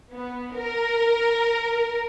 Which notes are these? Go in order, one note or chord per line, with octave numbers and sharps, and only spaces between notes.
B3
A#4